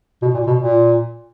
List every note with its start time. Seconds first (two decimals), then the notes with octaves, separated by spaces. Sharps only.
0.22 B2
0.34 A#2
0.47 B2
0.58 A#2